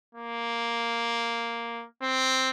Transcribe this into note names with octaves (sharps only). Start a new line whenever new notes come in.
A#3
C4